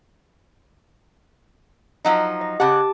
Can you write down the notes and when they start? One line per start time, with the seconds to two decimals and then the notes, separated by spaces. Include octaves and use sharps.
2.05 F3 F#3 D#4
2.41 D#5
2.60 C#3 G4 F#5 A5 D6